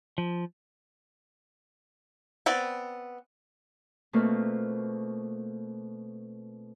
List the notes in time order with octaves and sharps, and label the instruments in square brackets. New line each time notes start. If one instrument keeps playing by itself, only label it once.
[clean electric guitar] F3
[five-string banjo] B3 C4 D5
[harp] B2 A3 A#3 C4 F4